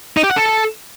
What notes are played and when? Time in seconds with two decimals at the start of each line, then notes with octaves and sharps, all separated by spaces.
0.17 D#4
0.23 G4
0.30 F#5
0.36 A4